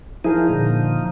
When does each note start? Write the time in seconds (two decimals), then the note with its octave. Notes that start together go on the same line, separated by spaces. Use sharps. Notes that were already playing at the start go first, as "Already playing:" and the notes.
0.24 F3 D#4 E4 G#4 A#4
0.49 A#2 D3